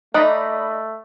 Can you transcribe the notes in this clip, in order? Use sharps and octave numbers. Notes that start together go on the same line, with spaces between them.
A3 D#4 D5 D#5 B5 D#6 F#6